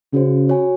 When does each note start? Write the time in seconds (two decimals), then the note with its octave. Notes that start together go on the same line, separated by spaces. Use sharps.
0.13 C#3 C#4 F#4 C5
0.49 F#4 C#5 G#5